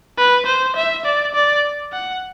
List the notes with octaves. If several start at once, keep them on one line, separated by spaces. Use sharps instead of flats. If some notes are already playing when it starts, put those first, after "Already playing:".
B4
C5
E5
D5
D5
F#5